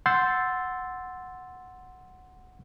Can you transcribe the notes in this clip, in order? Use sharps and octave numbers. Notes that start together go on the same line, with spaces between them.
F#5 C6 E6 G6 A6